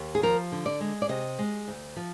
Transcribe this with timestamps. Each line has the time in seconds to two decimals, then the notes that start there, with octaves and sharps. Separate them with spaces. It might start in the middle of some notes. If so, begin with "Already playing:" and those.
Already playing: D#2
0.15 G#4
0.23 F3 A#4
0.52 D3
0.66 D5
0.80 G#3
1.02 D5
1.09 C3 D#5
1.38 G#3
1.68 D2
1.96 F3